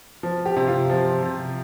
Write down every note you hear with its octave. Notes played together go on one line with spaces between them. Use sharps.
F3
G4
C3
F4
F3
C3